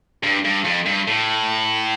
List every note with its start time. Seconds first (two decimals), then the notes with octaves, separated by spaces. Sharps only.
0.23 G2
0.45 G2
0.65 F2
0.86 G2
1.08 A2